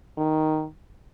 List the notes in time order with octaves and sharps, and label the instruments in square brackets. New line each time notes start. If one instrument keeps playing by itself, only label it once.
[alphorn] D#3